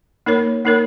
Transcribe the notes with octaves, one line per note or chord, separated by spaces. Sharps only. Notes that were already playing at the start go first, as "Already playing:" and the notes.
A#3 D#4 A#4 C#5
A#3 D#4 A#4 C#5